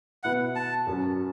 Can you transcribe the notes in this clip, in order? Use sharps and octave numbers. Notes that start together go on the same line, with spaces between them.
B2 B3 E4 F#5
A5
F#2 F#3 C#4